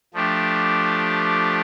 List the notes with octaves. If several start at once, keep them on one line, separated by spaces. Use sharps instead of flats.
F3 A3 D4 G4